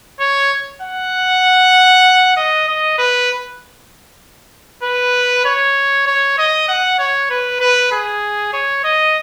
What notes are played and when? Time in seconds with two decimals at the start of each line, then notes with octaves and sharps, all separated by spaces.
0.20 C#5
0.82 F#5
2.37 D#5
2.68 D#5
2.98 B4
4.83 B4
5.45 C#5
6.07 C#5
6.38 D#5
6.68 F#5
6.99 C#5
7.30 B4
7.61 B4
7.92 G#4
8.53 C#5
8.84 D#5